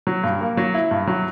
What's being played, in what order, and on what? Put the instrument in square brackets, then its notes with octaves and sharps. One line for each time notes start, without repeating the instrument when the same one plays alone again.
[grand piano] F#3
G2
A#3
F#3
E4
G2
F#3